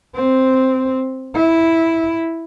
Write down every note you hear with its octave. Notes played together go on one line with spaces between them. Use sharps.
C4
E4